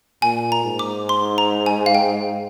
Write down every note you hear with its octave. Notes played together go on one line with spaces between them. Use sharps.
A#2 G#5
A#5
G#2
D6
C6
A#5
G#5
F5
G5